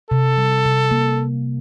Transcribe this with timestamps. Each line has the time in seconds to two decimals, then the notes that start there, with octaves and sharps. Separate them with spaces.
0.10 C3 A4
0.37 G3
0.65 C3
0.91 A#3